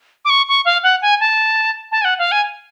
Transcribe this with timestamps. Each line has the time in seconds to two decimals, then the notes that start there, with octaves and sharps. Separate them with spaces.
0.25 D6
0.30 C#6
0.48 C#6
0.65 F5
0.83 F#5
1.02 G#5
1.20 A5
1.91 A5
2.01 G#5
2.05 F#5
2.19 F5
2.31 G#5